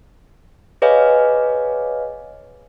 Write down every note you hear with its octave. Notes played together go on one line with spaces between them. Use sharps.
G#4 B4 C#5 D#5 F5 G#5